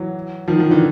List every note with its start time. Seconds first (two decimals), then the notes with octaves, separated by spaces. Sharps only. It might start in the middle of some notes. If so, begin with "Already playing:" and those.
Already playing: E3 F#3
0.48 D#3 F3
0.59 D#3 F3
0.70 D3 E3